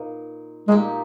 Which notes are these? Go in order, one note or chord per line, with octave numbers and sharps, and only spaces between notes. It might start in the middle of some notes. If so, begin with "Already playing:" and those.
Already playing: A#2 A#3 D#4 B4
A#2 G#3 A#3 D#4 G4